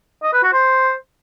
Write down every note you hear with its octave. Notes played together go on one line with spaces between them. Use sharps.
D#5
B4
F#4
C5